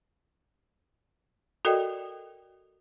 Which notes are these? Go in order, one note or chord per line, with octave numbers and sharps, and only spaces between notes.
F#4 A4 A#4 D5 D#5 G5